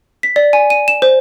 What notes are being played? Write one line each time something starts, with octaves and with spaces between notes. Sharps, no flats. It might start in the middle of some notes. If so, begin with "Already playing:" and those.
B6
D5
G#5
D#7
E7
C5